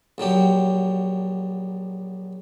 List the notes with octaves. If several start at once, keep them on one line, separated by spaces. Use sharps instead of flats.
A#1 D3 F#3 G4